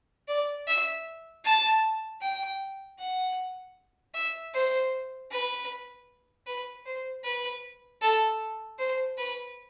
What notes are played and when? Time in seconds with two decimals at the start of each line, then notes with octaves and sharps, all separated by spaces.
0.28 D5
0.67 E5
1.44 A5
2.21 G5
2.99 F#5
4.14 E5
4.54 C5
5.31 B4
6.46 B4
6.85 C5
7.24 B4
8.01 A4
8.78 C5
9.18 B4